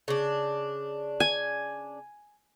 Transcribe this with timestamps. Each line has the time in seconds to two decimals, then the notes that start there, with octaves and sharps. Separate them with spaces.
0.08 C#3 D4
1.20 G#5